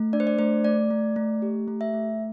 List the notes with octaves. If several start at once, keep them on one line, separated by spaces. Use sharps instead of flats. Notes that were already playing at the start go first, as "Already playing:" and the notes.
Already playing: A3
D4 D5
C5
D5
A3 C5
A3 D5
A3
A3
G4
A3
E5
A3